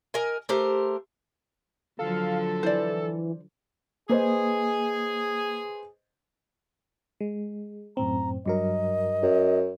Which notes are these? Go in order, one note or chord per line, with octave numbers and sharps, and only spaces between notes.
A#4 D#5 G#5
A3 G4 A#4 C5
D3 F3 F#3 A4 F5
E3 C5 D5
A#3 G#4 B4 C5 D#5
G#3
F#2 A2 C4 A#5
G2 F#3 A#4 D#5
F#2